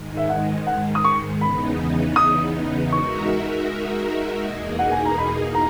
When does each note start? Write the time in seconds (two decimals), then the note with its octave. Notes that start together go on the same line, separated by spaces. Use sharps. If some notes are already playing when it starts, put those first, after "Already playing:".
Already playing: G#2 D#3 G#3
0.17 E5
0.29 F#5
0.67 F#5
0.95 D#6
1.04 C#6
1.41 E2 C#3 E3 B3 D#4 B5
2.16 D#6
2.92 G#3 D#4 F#4 A#4 E5 C#6
4.42 E2 B2 A#3 D#4 G#4
4.79 F#5
4.92 G#5
5.05 A#5
5.18 B5
5.55 A#5